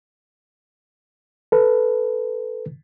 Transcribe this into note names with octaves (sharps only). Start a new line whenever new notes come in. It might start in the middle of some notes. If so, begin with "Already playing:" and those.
A4 B4